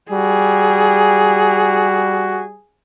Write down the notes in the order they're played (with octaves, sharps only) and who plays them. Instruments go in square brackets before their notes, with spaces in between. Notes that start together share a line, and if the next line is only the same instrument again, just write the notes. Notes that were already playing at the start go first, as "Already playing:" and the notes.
[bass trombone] G3 [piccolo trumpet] F#4 [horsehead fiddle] G#4